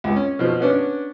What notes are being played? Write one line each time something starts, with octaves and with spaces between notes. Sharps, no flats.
C#2
C#4
B2 F3
B3 C#4 D4